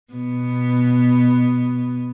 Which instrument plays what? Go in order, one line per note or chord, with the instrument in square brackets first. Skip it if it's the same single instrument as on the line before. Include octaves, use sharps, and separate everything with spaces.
[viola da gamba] B2 B3